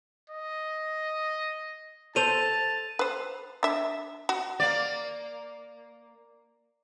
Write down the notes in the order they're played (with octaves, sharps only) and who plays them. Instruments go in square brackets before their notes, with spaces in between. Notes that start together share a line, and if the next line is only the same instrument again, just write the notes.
[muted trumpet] D#5
[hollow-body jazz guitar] A4 C5 [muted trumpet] A5 [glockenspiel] D#7 F7
[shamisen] B4 C5
D4 E5
F#4
[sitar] A#3 D5